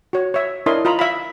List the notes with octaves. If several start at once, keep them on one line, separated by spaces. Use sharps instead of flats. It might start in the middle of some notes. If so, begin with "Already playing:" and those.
F#4 C#5
C#5 E5
D4 E4 A#4 C#5 D#5 C6
F4 D#5 A#5 B5
E5 F5 B5